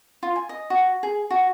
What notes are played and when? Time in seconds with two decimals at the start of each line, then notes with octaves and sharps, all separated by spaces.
0.23 F4
0.36 G#5
0.49 D#5
0.70 F#4
1.03 G#4
1.31 F#4